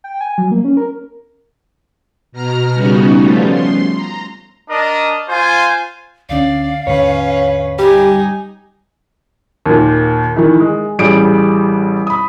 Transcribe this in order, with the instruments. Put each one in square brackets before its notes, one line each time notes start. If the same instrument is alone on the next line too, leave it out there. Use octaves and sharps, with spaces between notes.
[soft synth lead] G5
G#5
F#3
A#3
C#4
A#4
[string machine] B2 A#5 F6
C#3 G3 B3 C#4 D#4 F#4
F3 G3 A3 B3 C#4 F4
C6
A#5
[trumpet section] D4 A#4 D#5
F4 C5 G#5
[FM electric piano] D2 D3 C#4 [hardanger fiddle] D5 [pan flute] F5
[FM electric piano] D#2 G#2 D3 [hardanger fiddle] C#4 B4 [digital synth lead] C#5
[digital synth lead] G3 [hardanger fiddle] D#4 G#5 [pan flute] G4
[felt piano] D#2 A#2
D#3 E3 E4
G#3
A1 G3 G#4 D7
B5 D#6